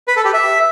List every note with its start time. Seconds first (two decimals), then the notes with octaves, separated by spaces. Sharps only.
0.08 B4
0.16 A4
0.25 G4
0.34 E5